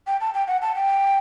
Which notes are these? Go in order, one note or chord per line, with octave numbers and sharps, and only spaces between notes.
G5
A5
G5
F#5
A5
G5